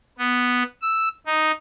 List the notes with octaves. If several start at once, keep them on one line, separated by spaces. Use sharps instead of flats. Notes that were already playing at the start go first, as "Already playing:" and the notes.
B3
E6
D#4